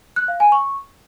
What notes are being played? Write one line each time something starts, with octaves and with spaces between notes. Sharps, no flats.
F#6
F5
G#5
C#6